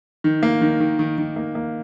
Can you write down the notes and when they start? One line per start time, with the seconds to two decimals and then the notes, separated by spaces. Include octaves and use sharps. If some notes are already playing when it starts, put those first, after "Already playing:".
0.24 D#3
0.43 A#3
0.61 D#3
0.80 D#3
0.99 D#3
1.18 D#3
1.36 A#3
1.55 A#3